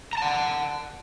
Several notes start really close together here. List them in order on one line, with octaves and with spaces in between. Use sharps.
A#5 A5 F#5